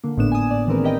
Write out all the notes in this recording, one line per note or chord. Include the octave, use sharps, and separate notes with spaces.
D3 A#3
G#1 A2 A3 B3 D4 E7
G#5 D#6
D5
D#3 E3 G#3 C4 A#4 B4
G4 A#4 B4 D#5 G5